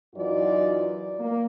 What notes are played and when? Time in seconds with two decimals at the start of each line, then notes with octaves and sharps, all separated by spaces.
0.14 F#2 E3 F#3 D#4 F4 D5
1.18 A#3